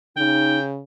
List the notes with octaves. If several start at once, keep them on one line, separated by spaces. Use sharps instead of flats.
C#3 D#4 G5